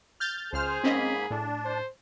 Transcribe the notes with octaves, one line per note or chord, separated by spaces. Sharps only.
F6 G6 A6
C#2 G#4 C5 F6
G#2 A#3 C4 C#4 D#5 B5
A2 D4
C5